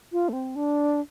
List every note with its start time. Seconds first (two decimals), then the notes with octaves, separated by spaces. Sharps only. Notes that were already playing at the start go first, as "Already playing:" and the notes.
0.12 F4
0.29 A3
0.33 C4
0.56 D4